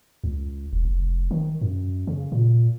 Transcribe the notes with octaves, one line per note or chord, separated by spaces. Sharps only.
C#2
E1
F1
D#3
F#2
C#3
A#2